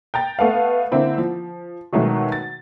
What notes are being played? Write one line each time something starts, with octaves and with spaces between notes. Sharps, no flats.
G5 A#5 A6
A3 B3 A4 F5
D3 A#3 C4 E4
F3
B2 D#3 F#3 G#3 A3 F#4
A6